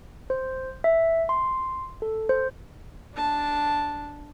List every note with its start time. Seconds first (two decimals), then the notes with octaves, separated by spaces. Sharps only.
0.30 C5
0.84 E5
1.29 C6
2.02 A4
2.29 C5
3.15 D4 A5